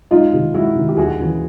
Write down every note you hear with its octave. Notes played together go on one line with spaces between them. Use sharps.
C#2 D#4 F4
C3 D#3
C#2 E4 F#4
C3 D#3
G4
D#2 F#4 G#4
C#3 E3